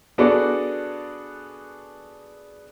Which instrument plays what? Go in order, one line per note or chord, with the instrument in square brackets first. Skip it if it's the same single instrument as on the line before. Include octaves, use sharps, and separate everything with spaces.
[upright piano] B3 D4 F#4 G#4 A4 D5